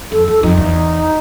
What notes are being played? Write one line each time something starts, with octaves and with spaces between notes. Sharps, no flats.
F2 A4
E2 A4
F2 D#4
E2